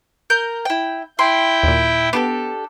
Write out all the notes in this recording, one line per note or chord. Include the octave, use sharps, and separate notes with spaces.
A#4 G6
E4 G5
E4 G5 C6
D#2 A#2
B3 D4 G4 A4